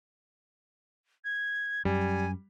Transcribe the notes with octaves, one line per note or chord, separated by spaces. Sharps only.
G#6
F#2 G3 G#5